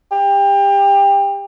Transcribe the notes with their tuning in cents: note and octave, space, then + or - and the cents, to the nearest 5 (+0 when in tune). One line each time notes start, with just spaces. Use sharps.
G4 +25